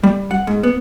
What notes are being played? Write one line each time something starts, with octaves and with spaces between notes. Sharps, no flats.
G3
F#5
G#2
B3